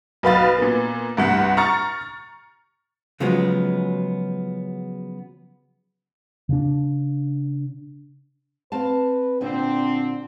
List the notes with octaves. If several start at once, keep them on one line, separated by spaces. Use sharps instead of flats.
B1 B4 F5 A6
A#2 B3
C2 G2 F#5
A#5 C#6 F6 A6 C#7
C#3 F3 F#3 G#3 B3
C#3 D4
C4 B4 F5 A5
A#2 D3 C4 D4